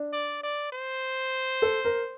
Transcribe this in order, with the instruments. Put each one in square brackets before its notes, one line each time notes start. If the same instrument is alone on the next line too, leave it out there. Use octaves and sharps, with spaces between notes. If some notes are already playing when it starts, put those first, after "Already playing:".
Already playing: [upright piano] D4
[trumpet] D5
D5
C5
[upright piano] A4
A#4